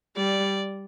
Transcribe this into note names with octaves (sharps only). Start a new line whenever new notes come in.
G3 D5